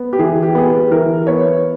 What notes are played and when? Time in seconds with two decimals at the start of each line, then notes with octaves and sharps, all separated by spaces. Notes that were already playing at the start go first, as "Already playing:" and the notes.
Already playing: B3
0.13 G4
0.19 E3 G#4
0.43 G4
0.55 B3 G#4
0.67 G4
0.91 E3 A#4
1.27 B3 C#5